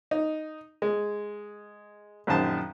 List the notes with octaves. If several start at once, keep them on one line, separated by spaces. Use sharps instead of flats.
D#4
G#3
A#1 F#2 D#3 C5 A5